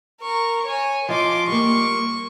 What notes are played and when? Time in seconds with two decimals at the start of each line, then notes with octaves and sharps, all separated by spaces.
0.21 A#4 C#6
0.66 C#5 G#5
1.09 F3 D#5 C6 D6
1.48 G3 A#3 C#6